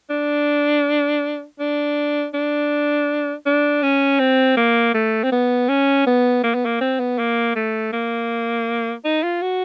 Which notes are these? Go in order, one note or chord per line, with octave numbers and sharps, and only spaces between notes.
D4
D4
D4
D4
C#4
C4
A#3
A3
C4
B3
C#4
B3
A#3
B3
A#3
C4
B3
A#3
A3
A#3
D#4
F4
F#4